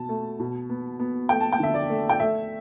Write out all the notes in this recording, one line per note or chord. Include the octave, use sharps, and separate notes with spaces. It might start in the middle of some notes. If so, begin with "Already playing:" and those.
Already playing: B2 A5
A3
B2
B3
B3
A3 G5
A5
G5
D3 E5
D5
A3
G5
A3 E5